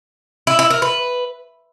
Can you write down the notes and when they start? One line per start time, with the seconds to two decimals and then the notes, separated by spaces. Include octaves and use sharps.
0.47 E4
0.59 E4
0.70 A#4
0.82 B4